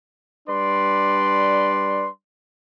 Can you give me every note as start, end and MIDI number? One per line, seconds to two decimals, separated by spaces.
0.48 2.08 55
0.48 2.08 62
0.48 2.08 71
0.48 2.08 74
0.48 2.08 84